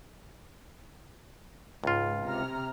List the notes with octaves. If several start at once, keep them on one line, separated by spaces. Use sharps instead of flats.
C#2 G#2 F4
C3 A#5 F6